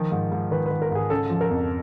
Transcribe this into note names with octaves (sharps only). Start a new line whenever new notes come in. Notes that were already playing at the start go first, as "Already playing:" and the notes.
Already playing: D#3 F3
G#2
G#2
D#3 B4
B4
D#3
A#4
G#2 G#4
C#3 A4
F3
A#4
F2